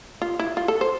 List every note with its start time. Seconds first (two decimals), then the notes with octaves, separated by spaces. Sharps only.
0.22 F4
0.39 E4
0.57 F4
0.68 A4
0.81 C5